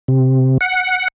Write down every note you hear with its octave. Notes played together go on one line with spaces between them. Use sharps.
C3
F#5